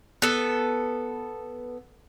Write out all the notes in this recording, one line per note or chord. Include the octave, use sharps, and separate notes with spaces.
B3 A4